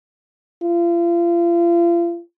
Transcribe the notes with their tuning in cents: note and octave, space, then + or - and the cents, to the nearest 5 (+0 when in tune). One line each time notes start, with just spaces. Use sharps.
F4 -40